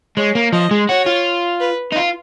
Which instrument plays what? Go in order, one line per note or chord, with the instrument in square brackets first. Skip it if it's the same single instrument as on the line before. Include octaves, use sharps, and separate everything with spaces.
[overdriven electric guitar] G#3 [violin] C#5
[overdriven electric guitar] A#3
[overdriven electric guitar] F3 [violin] D#5
[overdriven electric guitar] G#3
[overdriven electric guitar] F#4 [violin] C#5
[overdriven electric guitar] F4
[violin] B4
[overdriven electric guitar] D#4
F4